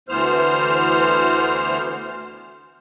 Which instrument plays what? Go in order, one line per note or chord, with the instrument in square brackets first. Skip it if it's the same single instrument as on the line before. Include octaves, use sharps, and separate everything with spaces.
[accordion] D2 E3 B3 C5 F6